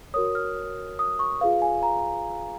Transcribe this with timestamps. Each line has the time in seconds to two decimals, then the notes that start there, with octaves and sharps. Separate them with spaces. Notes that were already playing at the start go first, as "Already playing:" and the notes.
0.14 F#4 A#4 C#5 D#6
0.35 F6
0.99 D#6
1.19 C#6
1.41 F4 G#4 B4 F5
1.62 G#5
1.83 A#5